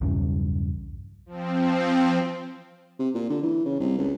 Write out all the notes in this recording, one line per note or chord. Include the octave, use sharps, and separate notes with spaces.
B1 E2 G2 C#3
F3 C4
C3
A#2
D3
E3
C#3
C2
C#2